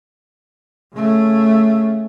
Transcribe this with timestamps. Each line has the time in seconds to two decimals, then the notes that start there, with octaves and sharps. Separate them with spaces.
0.94 C#3 A3